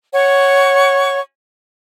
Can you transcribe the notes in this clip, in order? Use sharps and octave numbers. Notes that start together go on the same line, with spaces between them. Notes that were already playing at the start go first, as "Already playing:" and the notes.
C#5 F#5 C#6